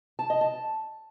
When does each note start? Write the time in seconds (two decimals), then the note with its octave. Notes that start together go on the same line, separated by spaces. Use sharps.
0.19 A5
0.30 D#5
0.41 A5